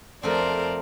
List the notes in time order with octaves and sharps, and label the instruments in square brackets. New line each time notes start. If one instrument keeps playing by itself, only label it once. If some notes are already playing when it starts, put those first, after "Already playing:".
[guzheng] F2 A3 C4 [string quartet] A#4 C5 D5